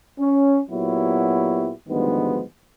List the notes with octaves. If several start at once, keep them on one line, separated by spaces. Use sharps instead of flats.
C#4
A#2 F#3 B3 E4 F#4 G4
D2 G2 D#3 F3 G#3 B3